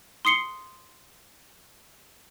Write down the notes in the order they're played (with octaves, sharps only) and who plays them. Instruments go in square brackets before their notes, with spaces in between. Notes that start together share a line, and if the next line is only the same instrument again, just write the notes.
[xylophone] C6 D#6 C7 C#7 G7